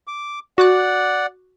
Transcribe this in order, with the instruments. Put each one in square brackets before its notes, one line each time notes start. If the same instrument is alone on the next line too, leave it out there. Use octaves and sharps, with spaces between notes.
[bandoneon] D6
[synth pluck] F#4 D6 F#6 [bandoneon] D5 F#5